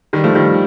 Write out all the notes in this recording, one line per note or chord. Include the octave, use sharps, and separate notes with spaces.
D#3 G3
F3 A3
D#3 G3